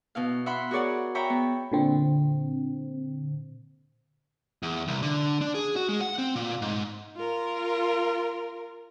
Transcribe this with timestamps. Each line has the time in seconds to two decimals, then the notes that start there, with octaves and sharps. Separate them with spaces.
0.15 B2 E4 F5
0.46 E5 F#5 B5 C6
0.71 F#4 G#4 A#4 C#5 D5 F#5
1.15 C#5 E5 G5 A#5 B5
1.30 B3
1.72 A#2 D3 C4
4.63 E2
4.88 C2
5.02 D3
5.41 D4
5.54 G#4
5.76 F#4
5.89 G#3
6.01 F#5
6.18 C4
6.36 A#2
6.62 G#2
7.17 F4 A#4